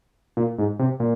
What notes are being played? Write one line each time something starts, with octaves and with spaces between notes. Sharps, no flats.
A#2
G#2
C3
A#2